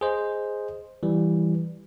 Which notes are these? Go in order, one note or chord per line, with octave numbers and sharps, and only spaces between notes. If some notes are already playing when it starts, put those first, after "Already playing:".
G#4 C5 D#5
E3 G3